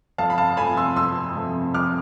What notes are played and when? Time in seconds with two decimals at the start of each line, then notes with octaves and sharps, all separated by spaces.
0.18 F2 F5 A5
0.30 B5
0.38 F5 A5
0.57 C3 F3 A3 G#5 B5
0.77 C6 E6
0.96 F2 C6 E6
1.35 C3 F3 A3
1.74 F2 D6 F6